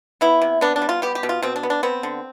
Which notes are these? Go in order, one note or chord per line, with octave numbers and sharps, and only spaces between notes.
B3 E4
C3
B3 D4
D4
G3
F4
B3 G4
G4
B2
F4
B2 C4
D4
B3
D4
B3 C4
D3